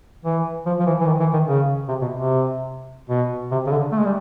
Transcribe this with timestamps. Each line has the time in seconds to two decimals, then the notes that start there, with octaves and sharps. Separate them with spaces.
0.25 E3
0.66 F3
0.79 F3
0.86 E3
1.01 E3
1.06 D#3
1.20 E3
1.33 D#3
1.48 C#3
1.88 C3
2.01 B2
2.15 C3
3.09 B2
3.51 C3
3.67 C#3
3.71 D3
3.92 A3
3.99 G#3
4.05 G3